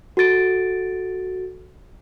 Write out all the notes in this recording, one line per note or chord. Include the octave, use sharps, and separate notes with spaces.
F#4 A4 A6 D7